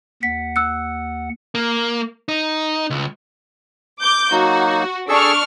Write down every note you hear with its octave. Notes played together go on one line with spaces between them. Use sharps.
D#2 F#5 B6
E6 F#6 C#7
A#3
D#4
C#2
D6 G6
F#3 A#3 D#4 F#4
D4 G#4 A4 C#6 E6 F6